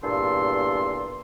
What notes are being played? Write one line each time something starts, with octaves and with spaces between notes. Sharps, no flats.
E2 G2 A#2 A4 C6